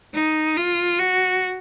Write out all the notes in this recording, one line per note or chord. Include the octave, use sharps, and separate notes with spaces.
D#4
F4
F#4